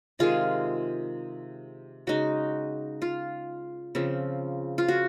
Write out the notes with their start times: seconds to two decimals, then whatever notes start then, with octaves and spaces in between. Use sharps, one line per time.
0.19 C3 D#3 G#3 F4 G#4
2.07 C#3 G#3 D#4 F#4
3.02 F4
3.95 C#3 F3 C4
4.78 F4
4.88 F#4